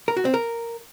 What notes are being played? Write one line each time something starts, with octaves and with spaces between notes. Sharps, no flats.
A#4
F#4
C4
A#4